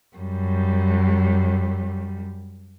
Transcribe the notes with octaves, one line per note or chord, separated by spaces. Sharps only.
F#2 G3